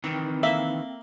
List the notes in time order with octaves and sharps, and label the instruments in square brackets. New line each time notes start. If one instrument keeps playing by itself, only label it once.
[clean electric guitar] D#3 E3 [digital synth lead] C4
[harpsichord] A#3 [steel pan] E5